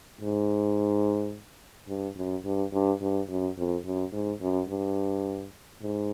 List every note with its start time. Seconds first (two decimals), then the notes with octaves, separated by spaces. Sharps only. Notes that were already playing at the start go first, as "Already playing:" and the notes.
0.20 G#2
1.88 G2
2.16 F#2
2.44 G2
2.73 G2
3.01 G2
3.29 F#2
3.57 F2
3.84 F#2
4.13 G#2
4.41 F#2
4.69 G2
5.82 G#2